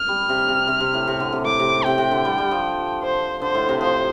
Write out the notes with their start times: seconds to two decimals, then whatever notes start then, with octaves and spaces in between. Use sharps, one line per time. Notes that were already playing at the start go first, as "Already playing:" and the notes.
Already playing: F6
0.08 G3
0.29 C3
0.49 C3
0.67 C3
0.80 C3
0.94 A2
1.08 C3
1.20 D3
1.32 C3
1.46 A2 D6
1.59 C3
1.85 C3 G5
1.98 C3
2.11 D3
2.25 G3
2.38 G3
2.51 F3
3.04 C5
3.42 D3 C5
3.55 A2
3.69 C3
3.81 F3 C5